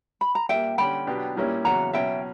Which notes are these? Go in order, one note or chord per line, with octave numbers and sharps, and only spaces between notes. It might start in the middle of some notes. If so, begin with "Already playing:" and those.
B5
A#5
A#2 G3 A#3 E5 G5
D3 G3 C#4 G5 B5
B2 F#3 B3 D4 G4
A#2 G3 A#3 C#4 E4
E2 C#3 F#3 F#5 A#5
B2 F#3 C#4 E5 G5